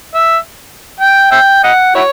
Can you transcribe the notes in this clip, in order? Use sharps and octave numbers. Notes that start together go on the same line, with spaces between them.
E5
G5
E5 G5
D#5 F#5
E4 F#4 C#5